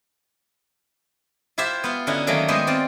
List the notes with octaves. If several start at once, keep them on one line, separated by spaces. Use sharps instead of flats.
E4 F4 G4 C5 E5
B3 F4
D3 C#4 D#4 E4 F#4
D#3 F#3 A3 A#3 C#4
G#3 B3 G4 C5 D#5
C4 F4 D5